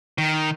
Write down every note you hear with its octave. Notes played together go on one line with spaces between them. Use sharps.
D#3